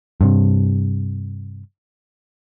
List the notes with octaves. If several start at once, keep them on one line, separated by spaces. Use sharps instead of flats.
G2 C3